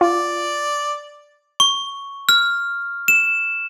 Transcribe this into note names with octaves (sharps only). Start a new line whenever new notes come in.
F4 D5
C#6
F6
E7